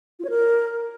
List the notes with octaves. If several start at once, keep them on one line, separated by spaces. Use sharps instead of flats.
F4
C#5
A#4